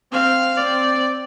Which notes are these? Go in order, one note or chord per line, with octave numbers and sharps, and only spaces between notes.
C4 F5
C4 D5